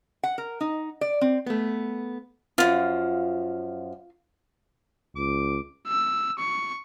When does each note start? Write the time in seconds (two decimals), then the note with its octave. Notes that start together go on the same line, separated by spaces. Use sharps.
0.23 F#5
0.38 A#4
0.61 D#4
1.01 D5
1.21 C4
1.46 A3 B3
2.58 F#2 F3 F4
5.16 C#2 D6
5.87 E6
6.39 C#6